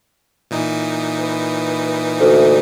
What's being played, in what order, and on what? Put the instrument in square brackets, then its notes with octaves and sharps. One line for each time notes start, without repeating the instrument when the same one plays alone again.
[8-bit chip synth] A#2 E3 D#4
[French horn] B4
[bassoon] D2